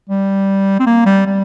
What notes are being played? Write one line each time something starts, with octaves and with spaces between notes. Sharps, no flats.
G3
C4
A#3
G3
G3